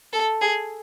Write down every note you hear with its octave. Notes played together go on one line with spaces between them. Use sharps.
A4
G#4